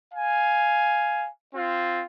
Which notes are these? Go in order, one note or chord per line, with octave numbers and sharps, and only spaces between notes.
F5 G#5
C4 F4